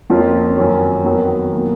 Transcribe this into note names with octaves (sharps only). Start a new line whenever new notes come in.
F2 F3 A#3 C#4 F4
F#2 D#3 F#3 C#4
F2 D#3 F#3 B3
B2 F#3 A#3